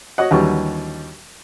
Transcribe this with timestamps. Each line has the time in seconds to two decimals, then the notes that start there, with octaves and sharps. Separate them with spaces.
0.18 F#4 C#5 D#5 F#5
0.31 D#2 D3 E3 F#3 G3 C#6